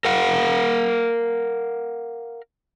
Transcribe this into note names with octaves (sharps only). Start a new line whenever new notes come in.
A#4 F5 F#5